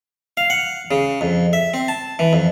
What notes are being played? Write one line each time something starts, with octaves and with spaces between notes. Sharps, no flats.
F5
F#5
C#3
F2
E5
C4
A5
E3
F2